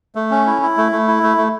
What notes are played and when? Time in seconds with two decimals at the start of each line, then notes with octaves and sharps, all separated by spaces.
0.15 A3
0.31 C#4
0.47 E4
0.62 E4
0.77 A3
0.92 A3
1.08 E4
1.23 A3
1.37 A3